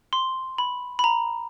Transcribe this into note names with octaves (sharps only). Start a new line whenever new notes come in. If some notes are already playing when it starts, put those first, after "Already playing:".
C6
B5
B5
A#5